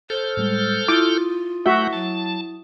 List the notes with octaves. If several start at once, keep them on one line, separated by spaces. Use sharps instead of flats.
A4 C5 F6 G6
A2 G3 G#3
E4 F4 D6 D#6
A3 F#4 E5 F#5 G6
F#3 A5